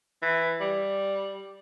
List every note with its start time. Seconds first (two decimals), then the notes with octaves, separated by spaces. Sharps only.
0.22 E3
0.60 G3